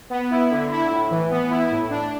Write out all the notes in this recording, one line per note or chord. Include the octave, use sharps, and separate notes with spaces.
B3
E4
D3
E4
A2
E3
B3
E4
A2
D4